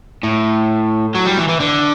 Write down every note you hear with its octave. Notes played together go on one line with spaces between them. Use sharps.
A2
F#3
G3
E3
E3
D3